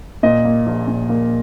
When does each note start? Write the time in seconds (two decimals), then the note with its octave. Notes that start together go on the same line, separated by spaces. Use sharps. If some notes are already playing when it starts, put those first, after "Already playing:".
0.23 A#2 D#5
0.45 A#3
0.66 A#1
0.88 A#2
1.09 A#3